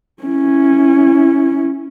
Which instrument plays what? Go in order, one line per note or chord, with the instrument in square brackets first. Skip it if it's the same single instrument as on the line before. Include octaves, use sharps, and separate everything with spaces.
[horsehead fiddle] C#4 E4